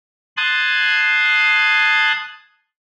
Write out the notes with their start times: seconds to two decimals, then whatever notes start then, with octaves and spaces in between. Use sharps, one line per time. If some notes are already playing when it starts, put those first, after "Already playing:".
0.37 A5 C6 D#6 F#6 G#6